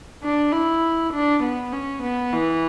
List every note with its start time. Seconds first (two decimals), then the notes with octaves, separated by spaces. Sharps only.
0.23 D4
0.53 E4
1.12 D4
1.43 B3
1.72 C#4
2.03 B3
2.33 E3